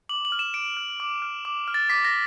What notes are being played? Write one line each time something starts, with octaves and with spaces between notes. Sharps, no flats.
D6 F#7
F#7
F6
E7
D6 D7
F6
D6
F6
D6
F6
A6
D6 B6
A#6